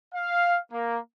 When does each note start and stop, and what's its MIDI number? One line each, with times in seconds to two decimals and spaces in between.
0.14 0.58 77
0.72 0.98 58